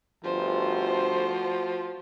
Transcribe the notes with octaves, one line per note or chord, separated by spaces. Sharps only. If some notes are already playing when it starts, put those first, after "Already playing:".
G1 F3 A3 F#4 C5